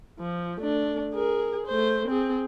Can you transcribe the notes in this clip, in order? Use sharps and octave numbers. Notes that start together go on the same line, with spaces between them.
F3
A3 D4
G#4 A#4
A3 C5
C4 G#4